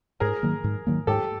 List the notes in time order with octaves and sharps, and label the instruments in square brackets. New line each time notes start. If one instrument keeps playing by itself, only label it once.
[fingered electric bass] G#2 [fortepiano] G#4 A#4
[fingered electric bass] D#3 F#3 A#3
G#2
D#3 F#3 A#3
[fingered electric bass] G#2 [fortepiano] G4 A4